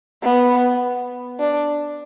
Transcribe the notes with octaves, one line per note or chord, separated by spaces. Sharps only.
B3
D4